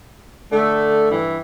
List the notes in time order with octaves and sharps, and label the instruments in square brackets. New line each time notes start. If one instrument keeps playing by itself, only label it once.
[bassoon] D3 [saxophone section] A3
[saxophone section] G2 E3